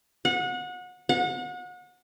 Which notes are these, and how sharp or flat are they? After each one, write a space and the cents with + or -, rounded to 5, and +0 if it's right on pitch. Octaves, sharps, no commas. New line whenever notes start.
F#5 -30
F#5 -35